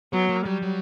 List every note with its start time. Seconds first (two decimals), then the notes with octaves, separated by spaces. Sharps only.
0.13 F#3 B3
0.29 A#3
0.45 F#3 G3
0.62 F#3